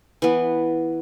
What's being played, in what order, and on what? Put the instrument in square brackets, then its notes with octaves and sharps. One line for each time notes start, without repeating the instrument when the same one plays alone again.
[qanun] E3 B3